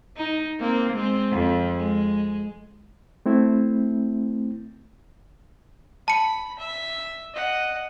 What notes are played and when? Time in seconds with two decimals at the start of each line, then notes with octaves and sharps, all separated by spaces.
0.17 D#4
0.60 A#3 C4
0.94 G#3 C4
1.32 F2
1.77 G#3
3.26 A3 C4 E4
6.08 A5 B5 C#7
6.59 E5
7.34 D#5 F#5